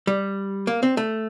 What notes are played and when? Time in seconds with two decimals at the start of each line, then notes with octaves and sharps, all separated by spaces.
0.07 G3
0.67 A#3
0.83 C4
0.97 A3